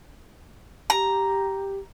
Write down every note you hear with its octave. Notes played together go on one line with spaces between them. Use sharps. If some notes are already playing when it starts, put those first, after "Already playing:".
G4 A#5